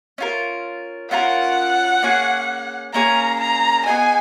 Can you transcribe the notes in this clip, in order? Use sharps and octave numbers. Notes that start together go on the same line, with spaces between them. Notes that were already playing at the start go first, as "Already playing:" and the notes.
C#4 F4 A#4
C#4 F4 A#4 F#5
A#3 C#4 G#4
A#3 C#4 G#4 A#5
A#5
B3 F4 G#4 D#5 G#5